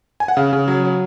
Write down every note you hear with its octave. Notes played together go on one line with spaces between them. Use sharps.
G#5
F#5
C#3 F5
C#3
F#3
F#3